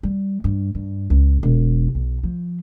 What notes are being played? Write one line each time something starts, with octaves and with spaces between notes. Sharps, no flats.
G3
G2
G2
C#2
E1
B1
F3